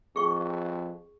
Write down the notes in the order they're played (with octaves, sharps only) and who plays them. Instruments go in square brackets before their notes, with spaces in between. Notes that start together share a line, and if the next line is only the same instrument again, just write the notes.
[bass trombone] F2 [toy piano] G#4 C#6